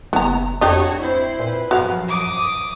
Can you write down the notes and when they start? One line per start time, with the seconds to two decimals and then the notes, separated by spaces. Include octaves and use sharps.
0.13 F#1 B3 A#5
0.61 F2 D4 F#4 G4 C#5 D#5
0.98 C4 E4 C5
1.39 A#2 B4
1.71 F#2 F3 F#4 F5
2.09 D6 D#6